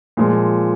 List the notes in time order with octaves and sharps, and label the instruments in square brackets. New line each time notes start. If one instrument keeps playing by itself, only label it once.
[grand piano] A#2 F3 G#3